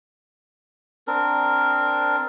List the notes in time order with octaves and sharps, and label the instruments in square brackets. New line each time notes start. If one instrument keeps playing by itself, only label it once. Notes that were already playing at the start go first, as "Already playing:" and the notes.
[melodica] C4 D4 A#4